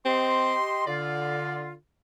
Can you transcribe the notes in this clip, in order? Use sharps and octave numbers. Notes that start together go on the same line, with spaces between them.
C4 G4 D#5 C6
D3 F4 D5